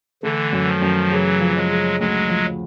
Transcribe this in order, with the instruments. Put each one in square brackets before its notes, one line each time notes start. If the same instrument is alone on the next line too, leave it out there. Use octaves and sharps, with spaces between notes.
[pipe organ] D3 E3 [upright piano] A3
[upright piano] F#2
[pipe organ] D#3 F3
[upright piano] F#2
[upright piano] C#3 [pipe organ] E3 F#3
[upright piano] F3
[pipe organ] F#3 G#3
[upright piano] C#3
[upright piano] D2 [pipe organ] F#3 G#3
[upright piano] F3